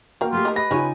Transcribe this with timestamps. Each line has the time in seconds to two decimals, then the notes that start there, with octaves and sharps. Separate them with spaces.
0.21 A#3 F#4 A#4 F5 G5
0.32 A3 F4 G4 G#4
0.45 D#4 A#4
0.56 G#3 B4 A#6
0.71 C#3 G3 D#4 F4 C#5 G#5